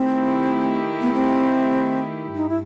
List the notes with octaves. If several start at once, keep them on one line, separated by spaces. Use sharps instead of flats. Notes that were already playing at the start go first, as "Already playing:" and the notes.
Already playing: D#3 A3 C4 E4 G4
B3
C4
G2 D#4
E4